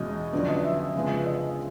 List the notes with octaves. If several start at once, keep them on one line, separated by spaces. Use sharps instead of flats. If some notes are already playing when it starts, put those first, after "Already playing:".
Already playing: E2 B2 G#3 C#4 D#5
F2 D3 F#3 B3 D4 D5
D#5
E5
E5
F2 C#3 F3 G#3 B3
D#5